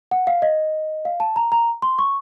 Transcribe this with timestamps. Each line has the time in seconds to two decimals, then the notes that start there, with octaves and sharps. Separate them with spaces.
0.11 F#5
0.27 F5
0.42 D#5
1.05 F5
1.20 A5
1.36 A#5
1.52 A#5
1.82 C6
1.99 C#6